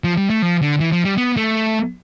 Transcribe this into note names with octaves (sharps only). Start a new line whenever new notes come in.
F3
G3
A3
F3
D3
E3
F3
G3
B3
A3